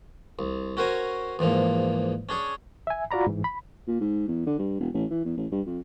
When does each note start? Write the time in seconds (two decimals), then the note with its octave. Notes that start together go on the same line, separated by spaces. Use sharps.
0.39 C2
0.77 C#4 F#4 A#4 C5 G#5 A#5
1.39 E2 G#2 F3 A#3
2.29 C#4 D4 G#4 C#5
2.87 E5 G#5
3.11 F4 F#4 D5 A#5 B5
3.27 G#2 E3
3.44 B5
3.88 A#2
4.01 G#2
4.28 E2
4.47 D3
4.59 G2
4.80 E1
4.94 A1
5.11 E3
5.25 E2
5.37 A1
5.52 G2
5.66 F2